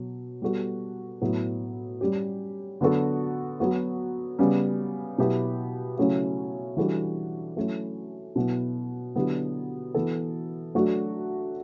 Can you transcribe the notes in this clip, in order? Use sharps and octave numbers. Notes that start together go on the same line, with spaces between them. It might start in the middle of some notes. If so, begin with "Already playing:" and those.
Already playing: B2 F#3
G3 B3 F#4 A4
A2 F#3 B3 E4
G3 C#4 G4
D3 F#3 B3 F#4 A4
F#3 B3 F#4
C#3 G3 B3
B2 F#3 B3 E4 G4
C#3 F#3 A3 C#4 E4
E3 G3 D4 F#4 A4
F#3 A3 C#4 E4
B2 F#3 B3 E4
D3 F#3 B3 E4 G4
E3 B3 F#4 A4
F#3 A3 D4 F#4